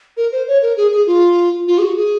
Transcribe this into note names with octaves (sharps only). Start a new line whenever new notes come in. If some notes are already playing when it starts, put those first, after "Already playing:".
A#4
C5
C#5
A#4
G#4
G#4
F4
F4
G#4
F#4
G#4